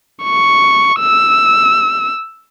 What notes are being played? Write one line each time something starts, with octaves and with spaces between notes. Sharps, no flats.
C#6
E6